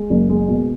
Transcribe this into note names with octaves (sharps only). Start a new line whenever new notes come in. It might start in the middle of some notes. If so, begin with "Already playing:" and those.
Already playing: G#3
F#1
G#3
B2